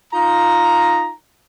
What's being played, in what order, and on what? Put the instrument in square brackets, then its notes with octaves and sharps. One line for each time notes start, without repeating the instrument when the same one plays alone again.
[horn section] D#4 F4 A#5